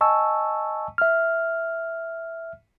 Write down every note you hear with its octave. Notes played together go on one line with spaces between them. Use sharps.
D#5 G#5 A5 C#6 E6
E5 F6